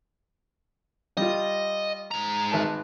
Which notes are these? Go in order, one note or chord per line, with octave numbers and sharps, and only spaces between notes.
G3 F4 D#5
G#2 A#5
G#1 B4 A5